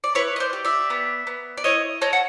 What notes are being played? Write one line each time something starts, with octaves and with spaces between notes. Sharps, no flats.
D5
E4 B4 C#5
D#5
C5 D5
G4
D5 E5
B3
B3
D5
E4 C#5 D#5
A4 C#5 D#5
F#5